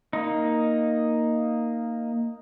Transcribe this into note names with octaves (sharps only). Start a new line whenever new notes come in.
A#3 D#4